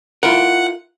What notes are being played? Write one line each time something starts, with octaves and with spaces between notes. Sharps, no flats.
E4 F4 A#4 F#5